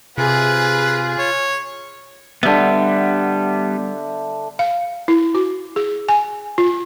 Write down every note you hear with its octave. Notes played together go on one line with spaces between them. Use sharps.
C3 F4 G#4 B4
C#5
D3 G3 B3 E5
F5
E4
F#4
G#4
G#5
F4